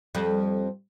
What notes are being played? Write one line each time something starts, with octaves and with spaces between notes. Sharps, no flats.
F2 G3